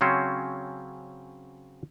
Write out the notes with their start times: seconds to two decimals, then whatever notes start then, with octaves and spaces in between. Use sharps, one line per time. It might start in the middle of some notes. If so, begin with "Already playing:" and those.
0.01 C#3 F#3 C4 C#4 C5